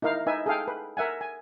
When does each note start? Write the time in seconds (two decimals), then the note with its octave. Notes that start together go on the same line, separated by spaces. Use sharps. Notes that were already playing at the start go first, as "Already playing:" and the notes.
0.02 D#4 E4 A#4 F5
0.27 D#4 B4 E5 G#5
0.46 G#4 A4 F5 G5
0.67 B4
0.97 A#4 E5 F#5 G#5
1.21 G#5